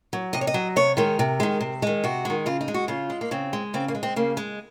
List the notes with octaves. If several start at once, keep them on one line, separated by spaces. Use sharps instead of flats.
F#3
C3 D#5
C#5
D#5
F#3
C3 C#5
D#3 G#3 A#4
C3
D#3 G#3
C3
D#3 G#3
C3 F#4
D#3 G#3
C#3 F4
D#4
G#3
F#4
C#3 F4
G#3
A#3
C#3 C4
G#3
C#3 C4
A#3
G#3
C4
C#3 A#3
G#3